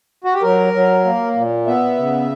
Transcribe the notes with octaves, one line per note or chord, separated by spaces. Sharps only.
F#4
G4
F#3 A#4
F#3
A#3
A#2
B3 E5
C#3